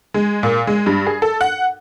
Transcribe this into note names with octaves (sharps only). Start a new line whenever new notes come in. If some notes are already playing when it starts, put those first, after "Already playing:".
G#3
A#2
G#3
G2
G#4
A4
F#5